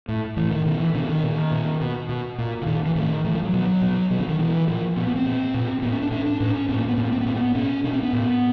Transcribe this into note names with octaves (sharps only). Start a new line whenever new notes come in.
A2
A2 E3
D#3
B2 D#3
E3
B2 D3
D#3
A#2
A#2
B2
B2
A#2
D3
A#2 D#3
E3
A2 D#3
A2 E3
F3
F#3
B2
B2
B2 F#3
D3
D#3
B2 E3
A#2 F3
A#2 B3
B3
C4
A#2
A#2
A2 B3
C#4
D4
A2 C#4
D4
A2 C#4
C#4
A2 C4
A#3
B3
A2 C4
B3
C4
B3
A2 C4
B3
B2 C#4
B2 D4
C4
B3
A2